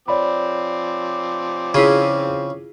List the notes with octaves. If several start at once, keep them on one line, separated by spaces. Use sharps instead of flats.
F3 C4 C#5 D5 B5 D6
C#3 E4 F4 G#4